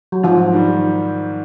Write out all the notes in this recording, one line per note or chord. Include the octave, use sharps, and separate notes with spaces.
F#3
G#2 F3
D#3 G3